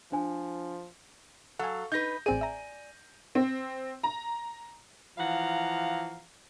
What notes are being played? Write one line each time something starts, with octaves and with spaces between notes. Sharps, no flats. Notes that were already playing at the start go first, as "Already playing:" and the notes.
F3 D4 C5 G#5
F#3 A4 F5 F#5 G#5
D#4 B4 G6 A#6
A1 C4 G#4 D5 G#5 D#7
E5 A#5
C4
A#5
E3 F3 F5 F#5 A#5